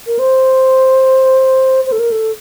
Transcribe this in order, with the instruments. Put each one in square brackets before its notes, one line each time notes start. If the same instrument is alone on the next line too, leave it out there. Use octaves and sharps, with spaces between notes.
[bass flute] A#4
C5
C5
A4
A#4
A4